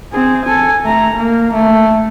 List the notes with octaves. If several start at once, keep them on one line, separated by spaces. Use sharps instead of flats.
C4 G#4
A4 G#5
A3 A#5
A#3
A3